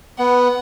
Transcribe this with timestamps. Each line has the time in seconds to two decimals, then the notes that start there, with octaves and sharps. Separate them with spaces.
0.18 B3 F#5